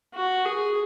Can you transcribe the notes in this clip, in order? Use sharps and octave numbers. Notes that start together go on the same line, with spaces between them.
F#4
G#4